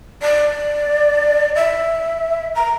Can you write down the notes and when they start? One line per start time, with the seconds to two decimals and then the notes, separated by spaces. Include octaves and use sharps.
0.22 D5
1.55 E5
2.55 A#5